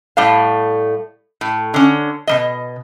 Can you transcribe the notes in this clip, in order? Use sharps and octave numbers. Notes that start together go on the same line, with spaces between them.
A2 G3 A3 F5
A2
D3 C#4
B2 G3 D#5